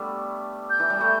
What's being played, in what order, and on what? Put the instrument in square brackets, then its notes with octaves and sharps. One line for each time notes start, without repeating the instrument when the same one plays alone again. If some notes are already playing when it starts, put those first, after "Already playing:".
Already playing: [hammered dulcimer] G3 A3 B3 D4
[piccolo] G6
[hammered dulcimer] E3
G3
A3